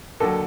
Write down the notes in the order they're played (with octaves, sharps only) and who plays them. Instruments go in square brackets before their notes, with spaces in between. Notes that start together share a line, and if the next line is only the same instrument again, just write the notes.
[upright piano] D#2 D3 F#3 A4